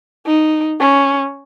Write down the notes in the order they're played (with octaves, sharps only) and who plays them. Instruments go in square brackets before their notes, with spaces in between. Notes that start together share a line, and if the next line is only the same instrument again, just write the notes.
[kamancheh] D#4
C#4